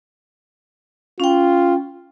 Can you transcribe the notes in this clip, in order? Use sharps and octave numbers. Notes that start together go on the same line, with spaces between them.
C#4 F4 G5